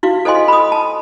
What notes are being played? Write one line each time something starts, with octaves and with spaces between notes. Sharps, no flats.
E4 F#4 F5
A4 C5 D#5 F5 G#5 C6
B5 D#6
A5